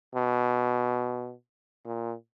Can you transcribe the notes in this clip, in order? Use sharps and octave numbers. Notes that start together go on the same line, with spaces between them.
B2
A#2